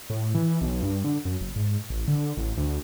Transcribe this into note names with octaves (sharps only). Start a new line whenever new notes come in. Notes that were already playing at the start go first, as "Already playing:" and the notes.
A2
E3
B1
G2
D3
F#2
F#1
G#2
A1
D3
A1
D2